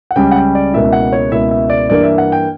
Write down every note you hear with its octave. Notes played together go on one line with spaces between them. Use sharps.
F#5
C#2 C#3 G3 C#4 G5
F#5
G5
D5
C#2 B2 A#3 E4 E5
F#5
C#5
C#2 B2 A#3 E4 E5
E5
D5
G2 E3 A#3 D4 D5
E5
F#5
G5